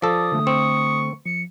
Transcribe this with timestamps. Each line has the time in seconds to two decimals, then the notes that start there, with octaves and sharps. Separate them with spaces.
0.02 F3 A4 D5 D#6
0.32 D3 A3
0.47 C4 C#6
1.26 F3 C#7